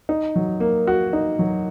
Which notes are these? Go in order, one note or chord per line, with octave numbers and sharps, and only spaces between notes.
D#4
F#3
A#3
F#4
D#4
F#3